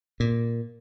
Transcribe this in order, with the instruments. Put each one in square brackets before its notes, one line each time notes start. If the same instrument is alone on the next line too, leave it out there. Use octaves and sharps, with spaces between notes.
[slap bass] A#2